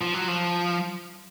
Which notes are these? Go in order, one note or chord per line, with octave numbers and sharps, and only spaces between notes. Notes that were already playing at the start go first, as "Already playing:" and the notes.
F3
F#3
F3